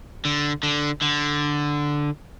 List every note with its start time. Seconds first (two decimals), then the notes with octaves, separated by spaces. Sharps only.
0.25 D3
0.63 D3
1.01 D3